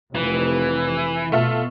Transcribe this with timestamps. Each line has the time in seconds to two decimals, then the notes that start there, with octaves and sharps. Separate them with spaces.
0.15 F1 E3
1.32 B2 A3 F4 A4